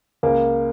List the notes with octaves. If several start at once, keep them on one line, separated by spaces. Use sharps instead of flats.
C#2 A#3